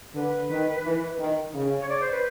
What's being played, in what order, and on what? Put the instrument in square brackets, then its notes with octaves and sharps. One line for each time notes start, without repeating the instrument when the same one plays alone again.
[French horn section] D3 [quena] B4
[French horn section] D#3
E3
D#3
C#3
[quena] C#5
D5
C5
B4